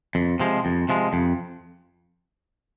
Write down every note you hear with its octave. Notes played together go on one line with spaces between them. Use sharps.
F2
C3 F3 G#3
F2
C3 F3 G#3
F2